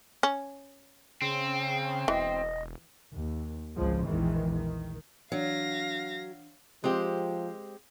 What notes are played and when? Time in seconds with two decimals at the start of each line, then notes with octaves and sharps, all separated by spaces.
0.23 C#4
1.22 C#3 C4
2.08 E1 E3 D#5
3.13 D#2
3.75 G#1 C#2 C#3 F3 G#3
4.05 A#1 E2 D#3 E3 G#3
4.52 D#3
5.32 E3 F#3 D4 F5 A#6
6.84 F3 G#3 C4 G4